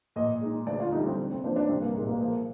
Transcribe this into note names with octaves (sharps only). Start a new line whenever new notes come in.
A#2 D#5
G#3 D#4
D2 D5
F4
D3 G3 D#4
C4
C3
C4
F3 A#3 D4 F4 C5
D4
C2 C4
A#3
A#2 G#3 D#4 A#4
A#3
F3 A#3